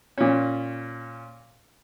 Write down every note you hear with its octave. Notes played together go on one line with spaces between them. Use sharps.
A#2 C#4